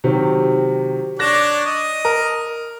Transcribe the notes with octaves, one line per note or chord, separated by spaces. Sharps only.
C3 D#3 F#3
D4 C#5 D5 F#6 A#6 E7
D#5
A#4